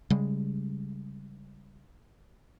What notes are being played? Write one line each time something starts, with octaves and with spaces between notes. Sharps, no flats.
C#3 G3 G#3